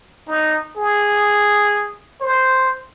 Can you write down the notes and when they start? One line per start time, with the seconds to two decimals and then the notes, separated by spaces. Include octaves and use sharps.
0.28 D#4
0.76 G#4
2.21 C5